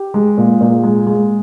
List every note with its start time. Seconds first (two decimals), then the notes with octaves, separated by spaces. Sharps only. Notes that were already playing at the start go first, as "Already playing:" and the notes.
Already playing: G4
0.14 G#3
0.38 A#2
0.61 A#2
0.83 G#3
1.07 G#3